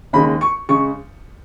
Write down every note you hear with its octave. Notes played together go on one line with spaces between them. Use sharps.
D#2 C#3 G#3 B5
C#6
C#3 G#3 C#6